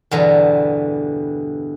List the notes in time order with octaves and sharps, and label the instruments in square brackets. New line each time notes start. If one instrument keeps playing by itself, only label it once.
[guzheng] E2 G2 B2 D3 C5 A#5